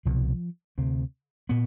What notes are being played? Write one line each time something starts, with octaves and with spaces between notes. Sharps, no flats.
C2 B2 F3
D2 C3
A#2 B3